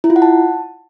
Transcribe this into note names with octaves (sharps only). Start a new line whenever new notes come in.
E4
F4
F#5
A5